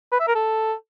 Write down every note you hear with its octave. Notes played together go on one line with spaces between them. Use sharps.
B4
E5
A#4
A4